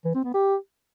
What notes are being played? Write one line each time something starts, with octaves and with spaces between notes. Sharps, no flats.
E3
C4
B3
G4